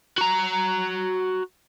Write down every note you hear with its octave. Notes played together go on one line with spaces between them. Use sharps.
F#4 A#5